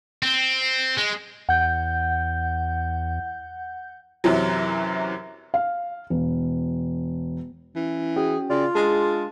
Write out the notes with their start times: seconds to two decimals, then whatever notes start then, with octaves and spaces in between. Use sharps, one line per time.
0.23 C4
0.97 G#3
1.49 E2 F#5 G6
4.24 F#2 C3 E3 F#3
5.54 F5
6.10 E1
7.76 E3 C#4
8.16 C#4 F#4 G#4 G5
8.50 C#3 F4 D5
8.75 G#3 D4 G#4 A5